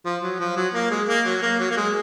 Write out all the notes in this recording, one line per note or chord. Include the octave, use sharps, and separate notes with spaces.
F3
F#3
F3
F#3
A#3
G#3
A#3
F#3
A#3
F#3
A#3
G#3